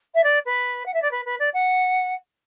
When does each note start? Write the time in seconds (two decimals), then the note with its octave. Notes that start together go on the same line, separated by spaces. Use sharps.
0.14 E5
0.23 D5
0.45 B4
0.85 F#5
0.93 E5
1.02 D5
1.11 B4
1.25 B4
1.39 D5
1.53 F#5